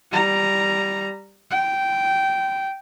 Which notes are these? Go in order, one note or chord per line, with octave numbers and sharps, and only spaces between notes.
G3 A#5
G5